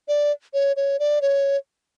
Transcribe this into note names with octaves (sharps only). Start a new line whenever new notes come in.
D5
C#5
C#5
D5
C#5